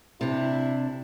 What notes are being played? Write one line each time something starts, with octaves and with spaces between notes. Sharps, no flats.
C3 D4 E4